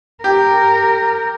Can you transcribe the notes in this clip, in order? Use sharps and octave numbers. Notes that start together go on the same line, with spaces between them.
G4 A#4